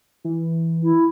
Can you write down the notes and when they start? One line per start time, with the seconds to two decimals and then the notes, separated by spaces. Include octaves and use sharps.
0.24 E3
0.83 E4